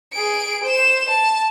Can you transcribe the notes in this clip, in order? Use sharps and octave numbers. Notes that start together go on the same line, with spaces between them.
G#4 D7
C5 E7
A5